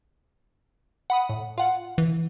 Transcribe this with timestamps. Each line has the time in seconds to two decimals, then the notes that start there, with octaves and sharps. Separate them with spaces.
1.10 F#5 B5 D#6
1.29 A2
1.58 F4 F#5
1.98 E3